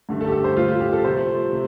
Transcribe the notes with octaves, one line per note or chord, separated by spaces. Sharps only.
G2 D3 A3
A4
G4
A4
C5
A2 G3 F4
F4
G4
A4
C3 F3 A3 C5
C3